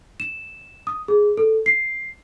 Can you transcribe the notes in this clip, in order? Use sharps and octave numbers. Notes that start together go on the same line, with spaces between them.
E7
D#6
G#4
A4
C7